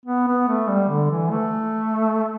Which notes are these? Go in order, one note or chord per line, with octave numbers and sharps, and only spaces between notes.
B3
B3
A3
G3
D3
E3
A3